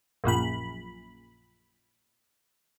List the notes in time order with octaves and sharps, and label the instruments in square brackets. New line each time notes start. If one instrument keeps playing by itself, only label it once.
[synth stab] A#1 F#2 A#2 B5